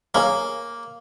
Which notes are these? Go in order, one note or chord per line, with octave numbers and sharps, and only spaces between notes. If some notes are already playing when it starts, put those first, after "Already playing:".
A#3 G#4 C#5 F5